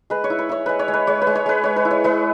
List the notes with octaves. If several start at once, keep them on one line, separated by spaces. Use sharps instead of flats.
G#3 B4
C#5
E4
B4
E4 C#5
G#3 B4
C#5
G#3
B4
G#3 C#5
B4
G#3
C#5
G#3 B4
G#3 C#5
B4
E4
C#5
G#3 B4